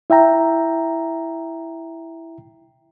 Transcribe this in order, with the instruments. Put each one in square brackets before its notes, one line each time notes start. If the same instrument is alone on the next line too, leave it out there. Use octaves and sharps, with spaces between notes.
[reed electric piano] E4 E5 G5 A#5